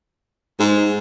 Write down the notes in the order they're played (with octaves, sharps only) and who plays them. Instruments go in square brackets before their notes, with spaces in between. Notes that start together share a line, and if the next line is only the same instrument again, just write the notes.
[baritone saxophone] G#2 [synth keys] G#4